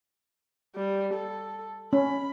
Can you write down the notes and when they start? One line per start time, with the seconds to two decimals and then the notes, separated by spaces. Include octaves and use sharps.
0.76 G3
1.14 A4
1.93 C#4 B5